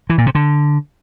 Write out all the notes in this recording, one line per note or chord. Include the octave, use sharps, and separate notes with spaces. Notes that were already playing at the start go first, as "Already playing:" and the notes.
E3
A#2
C3
D3